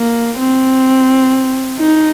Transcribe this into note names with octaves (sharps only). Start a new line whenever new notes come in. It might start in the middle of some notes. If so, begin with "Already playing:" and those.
Already playing: A#3
C4
D#4